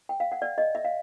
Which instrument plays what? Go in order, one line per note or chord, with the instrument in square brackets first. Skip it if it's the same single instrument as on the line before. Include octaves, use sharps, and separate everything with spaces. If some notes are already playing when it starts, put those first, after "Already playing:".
[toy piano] G5
F5
F#5
D5
D#5
E5
F5